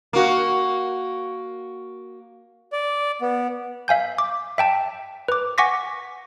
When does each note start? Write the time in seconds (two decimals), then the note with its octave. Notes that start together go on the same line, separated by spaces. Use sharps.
0.13 A#3 F#4
2.73 D5
3.21 B3
3.88 E5 F5 G#5 G6
4.18 D6
4.58 E5 G5 A5
5.28 B4 D6
5.58 F#5 G#5 C#6 D6 A#6 B6